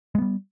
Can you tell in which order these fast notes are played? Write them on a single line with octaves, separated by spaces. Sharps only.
G#3 B3 G3